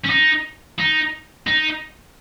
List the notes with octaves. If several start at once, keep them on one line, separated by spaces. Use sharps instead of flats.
C#4
D#4
D#4
D#4